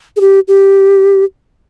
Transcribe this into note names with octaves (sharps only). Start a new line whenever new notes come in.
G#4
G4
G4